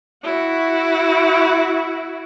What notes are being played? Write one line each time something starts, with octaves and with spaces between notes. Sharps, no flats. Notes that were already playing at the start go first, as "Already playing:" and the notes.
E4 F#4